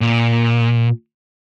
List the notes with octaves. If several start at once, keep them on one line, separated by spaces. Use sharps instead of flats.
A#2